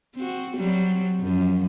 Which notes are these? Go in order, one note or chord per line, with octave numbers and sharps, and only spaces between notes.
C4 F#4
F#3 G3 C4
F#2 F3